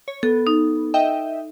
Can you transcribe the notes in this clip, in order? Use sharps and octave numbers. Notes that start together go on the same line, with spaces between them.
C#5
B3 A4
D#4
D#5 E5 G5